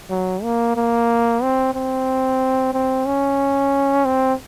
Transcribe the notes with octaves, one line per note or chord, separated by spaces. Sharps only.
F#3
A#3
A#3
C4
C4
C4
C#4
C4